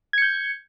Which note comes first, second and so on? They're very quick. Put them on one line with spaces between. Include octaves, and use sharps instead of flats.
G#6 C#7 G6